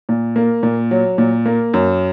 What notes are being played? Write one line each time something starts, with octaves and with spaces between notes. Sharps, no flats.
A#2
A#3
A#2
F#3
A#2
A#3
F#2